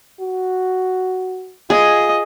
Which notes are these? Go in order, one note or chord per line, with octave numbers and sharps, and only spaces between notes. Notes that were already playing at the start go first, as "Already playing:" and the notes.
F#4
F4 G#4 D#5